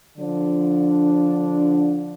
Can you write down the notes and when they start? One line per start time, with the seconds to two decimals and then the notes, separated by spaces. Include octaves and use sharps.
0.18 D3 F3 D4